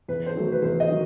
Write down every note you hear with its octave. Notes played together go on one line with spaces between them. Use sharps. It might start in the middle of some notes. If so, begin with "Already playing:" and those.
E2 B4
C5
D#3 F#3 A3
B4
E2 C5
D#5
D#3 F#3